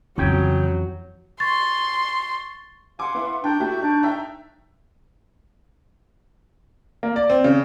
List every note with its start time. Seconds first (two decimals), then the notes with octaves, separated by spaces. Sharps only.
0.18 F2 C#3 E3 F#3 G5
1.40 C6 C#6 A6
2.99 F5 F#5 G#5 C6 D6
3.15 B3 E4
3.44 D4 G5 A#5 C#6 G6
3.60 A3 E4 F#4 G4
3.81 D4 D#4
4.03 D#4 E5 G5
7.03 A#3
7.16 D5
7.30 C4
7.44 C#3